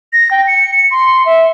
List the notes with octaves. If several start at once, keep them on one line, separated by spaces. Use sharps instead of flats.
A#6
G5
C#7
C6
E5